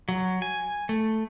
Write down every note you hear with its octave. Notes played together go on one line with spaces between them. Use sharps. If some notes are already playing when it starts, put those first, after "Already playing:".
F#3
G#5
A3